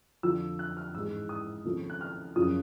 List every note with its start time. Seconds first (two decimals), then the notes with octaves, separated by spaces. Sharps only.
0.23 F2 D3 F3 E6
0.59 F#6
0.77 F6
0.94 A1 G#2 E3 G#3 E6
1.29 D#6
1.65 D#2 C#3 F3 A3 C4
1.90 F#6
2.01 F6
2.35 F#2 C#3 F3 A#3 C#4 D#6